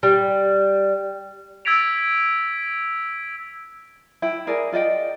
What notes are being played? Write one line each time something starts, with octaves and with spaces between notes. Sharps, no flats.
G3
E6 G#6 A6 B6 D7 F7
E4 G5
G#4 A#4 D5 G#5
F4 D5 D#5 G5